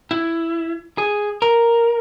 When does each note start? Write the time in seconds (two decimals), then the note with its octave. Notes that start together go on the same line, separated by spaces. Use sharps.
0.11 E4
0.98 G#4
1.42 A#4